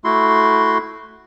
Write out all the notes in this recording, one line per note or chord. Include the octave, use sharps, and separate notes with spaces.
A3 E4 F#4 C6